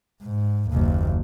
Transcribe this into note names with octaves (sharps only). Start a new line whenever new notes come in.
G#2
F#1 D#2